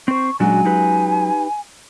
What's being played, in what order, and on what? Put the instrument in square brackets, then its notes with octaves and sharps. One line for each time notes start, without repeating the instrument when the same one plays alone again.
[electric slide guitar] C4 C5 [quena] C#6
[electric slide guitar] A#2 D4 F#4 [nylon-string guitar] F#3 G#3 C#4 [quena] G#5
[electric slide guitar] D#4 G4 B4